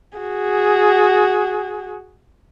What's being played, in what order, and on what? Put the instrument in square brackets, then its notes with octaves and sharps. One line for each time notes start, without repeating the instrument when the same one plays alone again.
[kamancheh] F#4 G#4